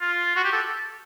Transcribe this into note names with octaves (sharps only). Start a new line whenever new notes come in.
F4
F#4
G4
A4